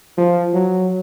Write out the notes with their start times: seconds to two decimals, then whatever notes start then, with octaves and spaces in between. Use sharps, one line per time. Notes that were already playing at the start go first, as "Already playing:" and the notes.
0.18 F3
0.54 F#3